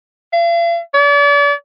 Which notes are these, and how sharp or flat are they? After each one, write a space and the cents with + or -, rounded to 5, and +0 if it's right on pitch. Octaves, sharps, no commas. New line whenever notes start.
F5 -45
D5 -40